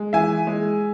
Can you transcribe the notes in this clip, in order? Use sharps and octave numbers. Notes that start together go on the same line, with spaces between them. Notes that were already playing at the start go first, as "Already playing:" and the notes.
Already playing: G#3
E3 E5 G#5
G#3